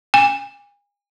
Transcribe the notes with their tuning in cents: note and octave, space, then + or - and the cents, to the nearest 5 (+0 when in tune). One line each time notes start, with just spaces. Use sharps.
G#5 -35